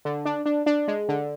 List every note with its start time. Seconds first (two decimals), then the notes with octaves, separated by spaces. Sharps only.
0.05 D3
0.25 D4
0.46 D4
0.66 D4
0.88 G#3
1.09 D3